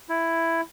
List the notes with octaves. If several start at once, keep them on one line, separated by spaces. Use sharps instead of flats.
E4